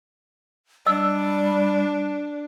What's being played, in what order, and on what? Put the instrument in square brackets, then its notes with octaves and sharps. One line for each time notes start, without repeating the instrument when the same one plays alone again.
[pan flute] G3 [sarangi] D4 [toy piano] D#5 E6